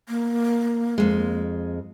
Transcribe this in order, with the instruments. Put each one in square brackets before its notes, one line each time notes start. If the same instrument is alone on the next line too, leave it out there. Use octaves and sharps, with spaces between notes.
[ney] A#3
[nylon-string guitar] F2 G#3